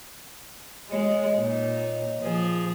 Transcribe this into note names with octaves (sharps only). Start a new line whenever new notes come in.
G#3 C#5 D#5
A#2 D#4
A#2 F3 G#4